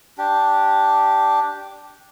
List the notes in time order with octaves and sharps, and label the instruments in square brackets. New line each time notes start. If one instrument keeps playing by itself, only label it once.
[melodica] D4 G4